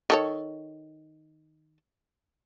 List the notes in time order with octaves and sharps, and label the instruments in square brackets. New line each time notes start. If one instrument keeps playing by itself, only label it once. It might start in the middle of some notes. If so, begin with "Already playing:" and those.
[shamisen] D#3 A4 C#5